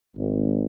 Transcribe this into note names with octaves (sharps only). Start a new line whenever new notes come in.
G#1